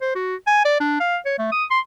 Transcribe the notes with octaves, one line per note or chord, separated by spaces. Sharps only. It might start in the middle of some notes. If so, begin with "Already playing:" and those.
C5
F#4
G#5
D5
D4
F5
C#5
A3
D#6
C6